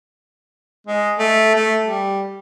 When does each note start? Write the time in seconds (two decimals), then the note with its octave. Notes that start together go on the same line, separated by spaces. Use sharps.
0.87 G#3
1.18 A3
1.55 A3
1.84 G3